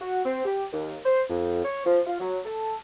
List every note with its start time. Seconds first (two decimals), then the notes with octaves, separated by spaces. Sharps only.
0.01 F#4
0.25 C4
0.45 G4
0.73 D#2
1.05 C5
1.30 F2
1.65 C#5
1.86 F3
2.07 F4
2.20 F#3
2.45 A4